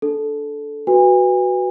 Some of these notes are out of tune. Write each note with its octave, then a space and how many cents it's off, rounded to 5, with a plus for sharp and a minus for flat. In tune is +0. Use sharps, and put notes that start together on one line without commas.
D4 +0 A4 -10
F#4 +0 B4 +0 G#5 -35